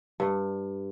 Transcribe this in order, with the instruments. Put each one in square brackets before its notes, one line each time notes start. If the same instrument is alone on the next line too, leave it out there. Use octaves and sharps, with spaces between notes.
[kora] G2